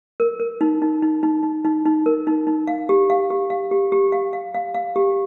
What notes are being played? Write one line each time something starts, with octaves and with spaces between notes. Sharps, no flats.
A#4
A#4
D#4
D#4
D#4
D#4
D#4
D#4
D#4
A#4
D#4
D#4
F5
G4
F5
G4
F5
G4
G4
F5
F5
F5
F5
G4